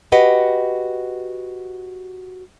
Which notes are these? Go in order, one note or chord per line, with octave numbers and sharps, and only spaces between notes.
F#4 G4 B4 D#5 F#5